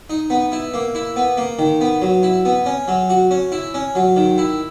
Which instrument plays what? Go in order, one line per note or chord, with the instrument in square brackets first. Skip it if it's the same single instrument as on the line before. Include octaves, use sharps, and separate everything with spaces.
[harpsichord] D#4
B3
E4
A#3
E4
B3
A#3
D#3
B3
F#3
E4
B3
C#4
F#3
F#4
C#4
E4
C#4
F#3
D#3
E4